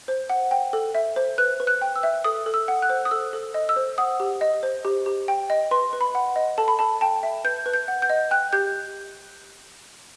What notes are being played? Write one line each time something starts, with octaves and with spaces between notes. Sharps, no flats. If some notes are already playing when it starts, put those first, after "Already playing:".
C5
F#5
G5
A4
E5
C5
B4 F#6
B4
F#6
G5
E6
E5
A4 D#6
A4
E6
F#5
F#6
C5
D#6
A4 E6
A4
D#5
E6
C5
F#5 D#6
G4
D#5
C5
G4
G4
G5
D#5
B4 C6
B4
B5
F#5
D#5
A4 A5
B5
A4 A5
G5 A5
E5
B4 G6
B4
G6
F#5
G6
D#5
G5 F#6
G4 G6